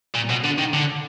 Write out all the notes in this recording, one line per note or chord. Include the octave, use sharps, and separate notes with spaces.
A#2
B2
D3
D#3
D3